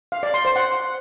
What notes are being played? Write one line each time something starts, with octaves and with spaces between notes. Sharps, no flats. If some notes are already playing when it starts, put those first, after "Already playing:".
F5
D5
C6
C5
F#5